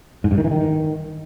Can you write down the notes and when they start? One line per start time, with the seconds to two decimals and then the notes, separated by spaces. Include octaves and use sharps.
0.24 G#2
0.31 G2
0.38 D#3
0.44 E3
0.51 D#3